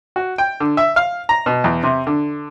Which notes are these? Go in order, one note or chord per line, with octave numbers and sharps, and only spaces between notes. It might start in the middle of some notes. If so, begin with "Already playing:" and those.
F#4
G5
D3
E5
F5
A#5
B2
E2
C3
D3